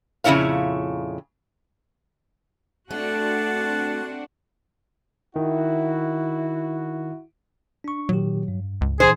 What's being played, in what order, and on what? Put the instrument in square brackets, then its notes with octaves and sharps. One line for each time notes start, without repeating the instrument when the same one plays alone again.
[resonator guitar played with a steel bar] F2 A#2 C#3 E4 C#5 F5
[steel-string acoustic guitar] A3 [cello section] C4 D4 F#4 [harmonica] F#5 A5
[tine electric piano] D#3 [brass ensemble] E4 F#4
[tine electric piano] D4 C#6
[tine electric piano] A#2 D#3 G4 [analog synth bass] F#3
[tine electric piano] G2
[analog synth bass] C#2
[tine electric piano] A#2 E3 [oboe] G#4 [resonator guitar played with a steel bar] C5